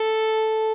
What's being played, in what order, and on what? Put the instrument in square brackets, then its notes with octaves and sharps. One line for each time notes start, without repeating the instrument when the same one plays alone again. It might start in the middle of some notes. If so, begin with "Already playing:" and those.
Already playing: [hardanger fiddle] A4